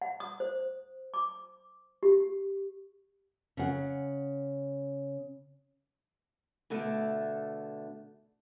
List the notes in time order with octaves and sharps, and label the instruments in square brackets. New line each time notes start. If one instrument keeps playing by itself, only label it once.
[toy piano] F#5
D#6
C5
D6
G4
[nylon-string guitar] C#3 F#5
[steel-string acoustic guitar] B2 D3 A3